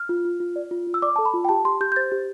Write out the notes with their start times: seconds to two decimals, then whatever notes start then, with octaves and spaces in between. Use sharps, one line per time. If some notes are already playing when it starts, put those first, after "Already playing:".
Already playing: F6
0.09 F4
0.25 F4
0.40 F4
0.56 D5
0.71 F4
0.87 F4
0.94 E6
1.02 D5 D6
1.16 A4 A5
1.25 B5
1.34 F4
1.45 G5
1.49 G4 A5
1.65 G4 C6
1.81 G4 G6
1.92 G6
1.96 C5 A6
2.12 G4